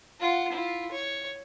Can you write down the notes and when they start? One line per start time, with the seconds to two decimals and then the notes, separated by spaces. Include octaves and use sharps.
0.20 F4 F#5
0.52 E4 F4
0.92 C#5